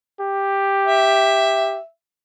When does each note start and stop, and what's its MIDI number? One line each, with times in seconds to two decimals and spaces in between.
0.20 1.79 67
0.85 1.84 76